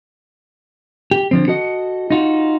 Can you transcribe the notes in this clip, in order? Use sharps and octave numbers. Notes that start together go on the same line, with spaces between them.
G4
D3 F3 C4
F#4 A4 D#5
D#4 F4 F#4